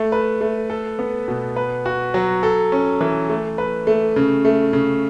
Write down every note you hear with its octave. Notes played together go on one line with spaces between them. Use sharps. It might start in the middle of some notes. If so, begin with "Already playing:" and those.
Already playing: A3
B4
A3
A4
B3
B2
B4
F#4
F#3
A4
C#4
E3
A3
B4
A3
C#3
A3
C#3